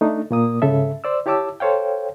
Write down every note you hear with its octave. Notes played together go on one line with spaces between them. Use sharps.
A3 D4 D#4
A#2 A#3 D#6
G#2 C#3 A4 E5
C5 D5 E6
E4 G4 C#5 A5 D6 E6
A4 C5 C#5 F5 G5